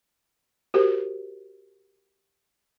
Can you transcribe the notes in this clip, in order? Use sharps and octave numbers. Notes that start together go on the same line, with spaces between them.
F#4 G4 A#4 C5